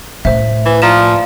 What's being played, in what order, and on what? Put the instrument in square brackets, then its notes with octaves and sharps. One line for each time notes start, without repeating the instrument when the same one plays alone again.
[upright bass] A2 [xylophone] C5 E5
[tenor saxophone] E3
[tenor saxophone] F3 [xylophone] D5 A#5 E7